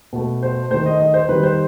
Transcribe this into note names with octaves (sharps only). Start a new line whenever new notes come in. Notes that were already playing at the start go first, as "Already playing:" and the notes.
B2 A3
C5
D#3 A3 C5
D#5
D#5
C5
D#3 G3 B4
C5